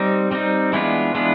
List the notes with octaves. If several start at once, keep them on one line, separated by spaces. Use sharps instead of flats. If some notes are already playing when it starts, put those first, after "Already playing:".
Already playing: G3 C4 D#4
G3 C4 D#4
E3 G#3 B3 D4 F4
E3 G#3 B3 D4 F4